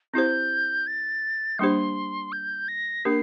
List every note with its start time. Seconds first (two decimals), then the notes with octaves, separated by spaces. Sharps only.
0.14 C4 E4 G4 C5 G6
0.87 A6
1.59 G3 A#3 D4 G4 C5 C6
2.32 G6
2.68 A#6
3.05 A#3 D4 G4 A#4 C7